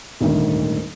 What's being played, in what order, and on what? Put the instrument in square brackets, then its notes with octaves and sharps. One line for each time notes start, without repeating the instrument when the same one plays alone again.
[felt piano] D#1 D2 G#2 D#3